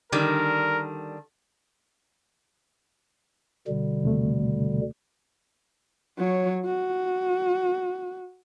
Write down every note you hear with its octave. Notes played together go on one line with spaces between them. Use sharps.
D3 D#3 G3 A#4
B2 D3 G3
D#2 C3 A3
F#3 C#5
F#4